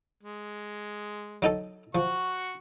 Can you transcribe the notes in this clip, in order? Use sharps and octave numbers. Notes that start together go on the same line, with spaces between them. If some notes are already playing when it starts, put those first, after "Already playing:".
G#3
F#3 D#4 A4
F3 F#4 C#6